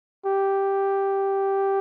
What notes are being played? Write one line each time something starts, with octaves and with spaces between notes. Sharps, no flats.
G4